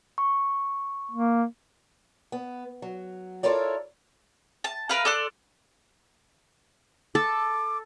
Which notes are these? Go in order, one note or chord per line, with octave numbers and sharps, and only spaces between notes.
C#6
A#3
B3
F#3
E4 F4 A4 A#4 C#5 D5
A5
A#4 B4 F5
A4 D5 C6 F#6
A4 D6